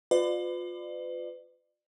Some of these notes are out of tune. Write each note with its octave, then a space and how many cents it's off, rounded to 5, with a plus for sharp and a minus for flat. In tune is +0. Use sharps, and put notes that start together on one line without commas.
F4 +25 B4 +40 D5 +30